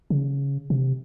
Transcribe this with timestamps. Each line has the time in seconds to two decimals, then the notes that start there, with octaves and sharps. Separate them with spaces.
0.10 C#3
0.70 C3